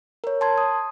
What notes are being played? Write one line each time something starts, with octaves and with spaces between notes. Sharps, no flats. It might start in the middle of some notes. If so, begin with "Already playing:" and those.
A#4 C#5
A5 C6 G#6
D#6